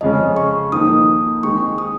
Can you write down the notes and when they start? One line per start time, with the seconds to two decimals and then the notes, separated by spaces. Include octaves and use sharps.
0.01 F2 C#3 G#3 C#4 D#5
0.36 C#6
0.71 F2 D#3 A#3 D#4 D#6
1.43 D#3 G#3 C4 D#4 C#6
1.78 D#6